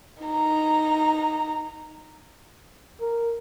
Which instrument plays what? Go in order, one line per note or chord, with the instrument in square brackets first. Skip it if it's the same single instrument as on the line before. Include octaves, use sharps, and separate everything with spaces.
[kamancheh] D#4 A#5
[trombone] A#4